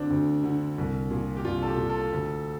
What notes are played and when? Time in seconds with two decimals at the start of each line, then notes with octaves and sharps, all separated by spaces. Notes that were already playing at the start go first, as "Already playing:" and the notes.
Already playing: D2 D3 C4 D4
0.10 D2
0.44 D3
0.78 C2
1.11 A#2
1.37 G4
1.45 C2 F4
1.62 A4
1.67 G4
1.77 A#2
1.90 A4
2.12 D2